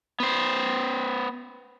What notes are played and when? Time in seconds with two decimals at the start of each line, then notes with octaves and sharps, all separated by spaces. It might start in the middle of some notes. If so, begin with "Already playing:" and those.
0.20 B3 C5